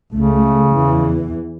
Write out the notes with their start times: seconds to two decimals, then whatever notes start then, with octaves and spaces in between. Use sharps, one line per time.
0.13 C#2 C#3 A3
0.74 E2 E3